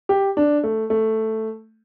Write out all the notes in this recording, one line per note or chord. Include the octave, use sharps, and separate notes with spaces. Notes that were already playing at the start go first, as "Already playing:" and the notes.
G4
D4
A3
A3